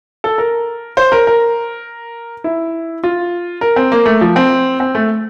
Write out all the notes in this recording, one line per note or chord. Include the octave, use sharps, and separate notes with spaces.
A4
A#4
C5
A#4
A#4
E4
F4
A#4
C4
A#3
A3
F3
C4
C4
A3